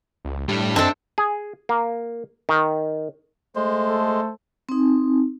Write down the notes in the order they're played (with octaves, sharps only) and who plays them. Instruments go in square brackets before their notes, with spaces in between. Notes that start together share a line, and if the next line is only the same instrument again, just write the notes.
[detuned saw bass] C#2
[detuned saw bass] A2 [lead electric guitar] G3 D4
[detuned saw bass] F#2 [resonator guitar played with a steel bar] C4 A4 [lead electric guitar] D4 [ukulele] D#5 E5 A5
[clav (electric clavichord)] G#4
A#3
D#3
[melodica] G#3 [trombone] A3 [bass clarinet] C5
[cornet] A4
[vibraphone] C4 D#4